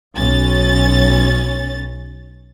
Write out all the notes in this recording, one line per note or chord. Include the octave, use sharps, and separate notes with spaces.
B1 C#4 A6